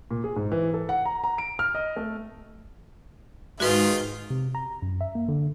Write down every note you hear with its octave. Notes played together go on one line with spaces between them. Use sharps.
A#2
G#4
G#2
E3
A4
F#5
A#5
A#5
D7
F6
D#5
A3
G#2 D#3 G#3 F4 F#4 B4
C3
A#5
F#2
E5
A#3
D3